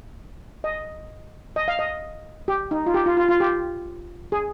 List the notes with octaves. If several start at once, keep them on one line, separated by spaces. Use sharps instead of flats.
D#5
D#5
F5
D#5
G4
D#4
F4
G4
F4
F4
F4
G4
G#4